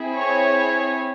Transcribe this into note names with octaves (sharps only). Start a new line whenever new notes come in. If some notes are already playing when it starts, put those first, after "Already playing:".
Already playing: C4 E4 G#4
C#5